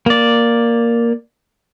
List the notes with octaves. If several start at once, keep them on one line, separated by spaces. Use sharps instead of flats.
A#3 D5